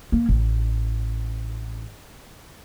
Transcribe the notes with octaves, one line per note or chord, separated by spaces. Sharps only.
A#3
A1